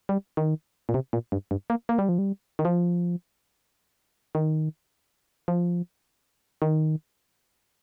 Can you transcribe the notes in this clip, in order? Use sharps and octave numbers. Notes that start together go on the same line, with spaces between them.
G3
D#3
A#2
C3
A#2
G2
G2
A#3
A#3
G3
F3
G3
D#3
F3
D#3
F3
D#3